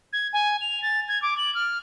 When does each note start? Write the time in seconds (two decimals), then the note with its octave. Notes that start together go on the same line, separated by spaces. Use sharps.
0.13 G#6
0.33 G#5
0.61 F7
0.82 A6
1.08 G#6
1.22 D6
1.38 F#7
1.55 F6